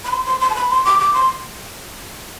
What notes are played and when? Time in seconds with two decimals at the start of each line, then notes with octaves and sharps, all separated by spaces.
0.04 B5
0.10 C6
0.25 C6
0.40 C6
0.50 A5
0.55 B5
0.70 C6
0.85 D6
0.99 D6
1.14 C6